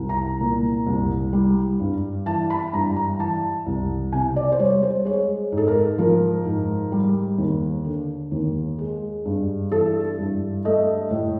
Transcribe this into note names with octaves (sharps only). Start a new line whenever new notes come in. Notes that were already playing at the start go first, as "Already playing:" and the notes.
Already playing: C2
A#5
A#2
C2
G3
G2
E3 A5
B5
G2 A#5
A#5
E3 A5
C2
C3 G#5
D5
C5
G3 C#5
C5
G#3 C#5
G#2
A4
A#4
F3 A#4
G#2
G3
D#2
D3
D#2
G#3
G2
E3 A4
G2
A3 D#5
A2